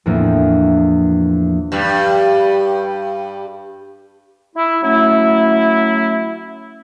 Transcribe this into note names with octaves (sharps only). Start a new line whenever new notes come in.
E2 A2 F3 A#3 C4 D4
G2 G3
E4
F#3 A3 C#4 E4